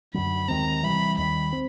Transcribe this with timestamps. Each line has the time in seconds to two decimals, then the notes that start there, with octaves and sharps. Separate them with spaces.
0.14 F#2 D3 F#3 B5
0.48 D#2 D#3 G#3 C4 A#5
0.83 C3 E3 G3 B5
1.18 D#2 D#3 G3 B5
1.53 C4